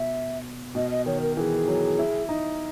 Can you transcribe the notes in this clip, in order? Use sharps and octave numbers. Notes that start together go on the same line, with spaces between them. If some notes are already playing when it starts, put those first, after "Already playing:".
Already playing: B2 E5
B2 D#5
D#5
D#3 C#5
A#4
E3 G#4 A#4
F#3
E4
D#4